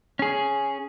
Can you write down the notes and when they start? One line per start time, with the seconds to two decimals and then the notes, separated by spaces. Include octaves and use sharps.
0.19 C#4 G#4